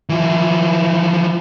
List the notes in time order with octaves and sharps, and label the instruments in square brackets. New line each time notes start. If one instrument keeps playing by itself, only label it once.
[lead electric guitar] E3 F3